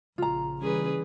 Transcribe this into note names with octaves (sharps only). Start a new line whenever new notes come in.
A#1 C#3 F4 A#5
E3 G3 C#4 G#4 B4